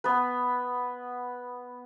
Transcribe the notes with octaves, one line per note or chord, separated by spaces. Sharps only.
B3 B4